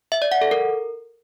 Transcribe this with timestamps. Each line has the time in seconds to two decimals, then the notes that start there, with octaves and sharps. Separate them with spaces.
0.12 E5
0.22 D5
0.32 F#5
0.41 A4
0.51 A#4